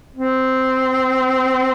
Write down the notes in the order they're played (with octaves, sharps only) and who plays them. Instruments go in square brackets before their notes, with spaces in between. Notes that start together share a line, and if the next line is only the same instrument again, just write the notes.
[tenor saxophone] C4